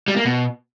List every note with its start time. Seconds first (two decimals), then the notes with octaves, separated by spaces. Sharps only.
0.08 G3
0.17 A#3
0.25 B2